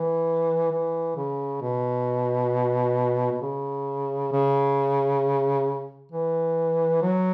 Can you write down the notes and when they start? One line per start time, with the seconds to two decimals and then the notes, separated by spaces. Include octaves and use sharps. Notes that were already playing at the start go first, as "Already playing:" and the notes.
Already playing: E3
0.72 E3
1.16 C#3
1.61 B2
3.32 B2
3.42 C#3
4.32 C#3
6.12 E3
7.02 F#3